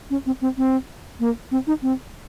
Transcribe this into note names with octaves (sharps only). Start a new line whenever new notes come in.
C#4
C4
C4
C4
A#3
C4
D#4
C4